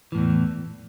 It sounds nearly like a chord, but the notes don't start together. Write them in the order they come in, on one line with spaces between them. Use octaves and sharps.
E3 A2 E2